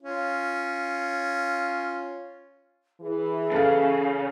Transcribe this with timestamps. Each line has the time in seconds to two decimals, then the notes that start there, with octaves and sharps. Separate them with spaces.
0.03 C#4 F4
3.01 E3 G#4
3.52 C#3 A4 F5